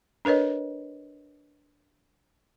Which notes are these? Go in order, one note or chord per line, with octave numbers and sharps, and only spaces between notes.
D4 A#4 B4 C#5 D#5